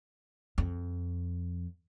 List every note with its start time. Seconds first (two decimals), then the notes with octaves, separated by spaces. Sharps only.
0.58 F2